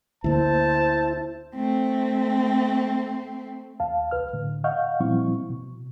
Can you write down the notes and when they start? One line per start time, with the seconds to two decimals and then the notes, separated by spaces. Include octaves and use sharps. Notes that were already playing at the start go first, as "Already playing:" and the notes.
0.24 D2 D3 A#3 E4 C5 A5
1.55 A3 C4
3.80 D#2 F5 A5
4.11 C2 B4 F6
4.33 A2 D3
4.64 D#5 F5 F#5 C#6 F6 G6
5.00 A#2 F3 G3 C4 E4 C#6
5.50 B2